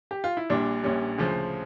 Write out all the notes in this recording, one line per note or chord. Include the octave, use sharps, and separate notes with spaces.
G4
F4
E4
A#1 A#2 G3 D4
A#1 A#2 G3 C#4
D2 C#3 F3